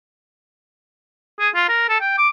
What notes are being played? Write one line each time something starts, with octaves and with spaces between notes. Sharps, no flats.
G#4
F4
A#4
A4
G5
D6